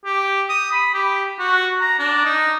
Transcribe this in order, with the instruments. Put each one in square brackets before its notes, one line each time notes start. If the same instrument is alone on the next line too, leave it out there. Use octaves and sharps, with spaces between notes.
[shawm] G4
D#6
B5
G4
F#4
A#5
D4
D#4